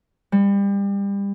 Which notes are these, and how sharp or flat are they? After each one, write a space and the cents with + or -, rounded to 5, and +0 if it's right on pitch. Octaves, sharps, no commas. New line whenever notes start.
G3 +30